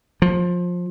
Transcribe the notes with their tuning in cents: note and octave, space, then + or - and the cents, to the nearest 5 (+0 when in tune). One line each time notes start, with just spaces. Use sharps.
F3 +20